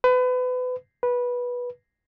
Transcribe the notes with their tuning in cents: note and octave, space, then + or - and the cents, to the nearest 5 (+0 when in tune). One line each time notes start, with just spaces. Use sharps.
B4 +30
B4 -15